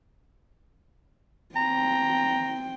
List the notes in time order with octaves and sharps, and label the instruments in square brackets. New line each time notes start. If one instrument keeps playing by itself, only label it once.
[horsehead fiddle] C4 G5 [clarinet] A#5